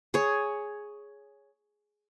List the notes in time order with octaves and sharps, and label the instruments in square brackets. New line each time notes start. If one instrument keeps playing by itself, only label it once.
[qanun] G#4 C#5